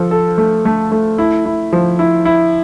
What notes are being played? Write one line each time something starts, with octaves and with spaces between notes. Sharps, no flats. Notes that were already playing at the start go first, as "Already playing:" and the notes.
Already playing: F3 A4
A4
A3
A3
A3
E4
E4
F3
E4
E4